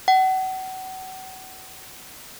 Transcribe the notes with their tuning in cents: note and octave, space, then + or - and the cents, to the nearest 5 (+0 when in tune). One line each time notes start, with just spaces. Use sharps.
F#5 +35